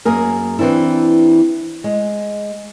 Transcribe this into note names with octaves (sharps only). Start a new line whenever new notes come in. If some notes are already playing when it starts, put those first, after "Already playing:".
F#2 A#3 G#4 A#4
E3 C4 D4 E4
G#3